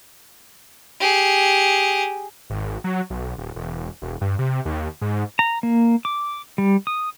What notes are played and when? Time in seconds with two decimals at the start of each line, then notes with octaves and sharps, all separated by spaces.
1.00 G4 G#4
2.50 G#1
2.84 F#3
3.10 B1
3.38 D#1
3.56 E1
4.02 E1
4.21 G2
4.39 C3
4.65 D#2
5.01 G#2
5.39 A#5
5.63 A#3
6.05 D6
6.58 G3
6.87 D#6